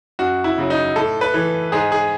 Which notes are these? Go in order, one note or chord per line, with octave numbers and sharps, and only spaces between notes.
F#2 F#4
E4
C#3 F#3
D#4
A2 A4
B4
E3
G#2 G#4
G#4